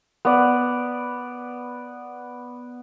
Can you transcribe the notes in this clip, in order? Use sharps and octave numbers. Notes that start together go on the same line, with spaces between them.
B3 D5